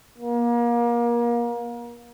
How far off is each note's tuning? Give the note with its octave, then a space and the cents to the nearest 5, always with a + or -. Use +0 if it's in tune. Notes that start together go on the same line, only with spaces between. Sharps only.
A#3 +30